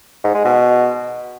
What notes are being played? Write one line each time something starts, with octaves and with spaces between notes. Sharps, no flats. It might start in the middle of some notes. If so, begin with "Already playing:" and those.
G#2
G#3
B2